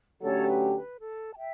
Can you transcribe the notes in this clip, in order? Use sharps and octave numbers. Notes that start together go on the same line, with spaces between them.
D3 F#3 A3 C#4 G4 A4 C#5
B4
B4
A4
A5
E5 G5